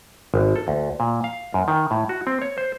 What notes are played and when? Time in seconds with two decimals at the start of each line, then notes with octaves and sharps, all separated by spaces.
0.34 G#1
0.56 A4
0.68 D2
1.00 A#2
1.24 F5
1.54 F#2
1.68 D#3
1.91 A2
2.09 F#4
2.27 C4
2.42 C#5
2.58 C5